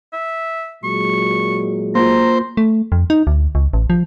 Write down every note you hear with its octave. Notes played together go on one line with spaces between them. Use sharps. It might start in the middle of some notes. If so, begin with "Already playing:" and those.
E5
A#2 F#3 G#3 C#6
A#3 F4 C5 A#5
A3
F2
D#4
D2
C#2
A1
F3